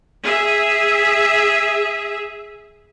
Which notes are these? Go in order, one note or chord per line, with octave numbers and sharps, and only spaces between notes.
G#4 E5